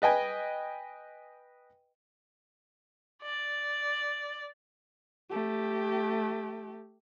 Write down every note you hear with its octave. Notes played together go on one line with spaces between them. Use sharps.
B4 D#5 G5 G#5
D5
A3 G4